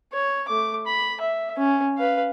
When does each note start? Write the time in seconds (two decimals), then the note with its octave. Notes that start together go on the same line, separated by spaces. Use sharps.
0.13 C#5
0.48 A3 D6
0.86 B5
1.20 E5
1.58 C#4
1.98 B4 F5